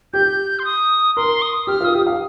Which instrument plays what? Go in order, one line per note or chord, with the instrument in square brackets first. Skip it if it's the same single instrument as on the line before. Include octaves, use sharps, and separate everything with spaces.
[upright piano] G4 [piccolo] G6
[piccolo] C6
D#6
[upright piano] A#4 [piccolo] C6
[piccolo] D#6
[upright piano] G4 [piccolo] F6
[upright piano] F4
[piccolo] D#6
[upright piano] G4
F5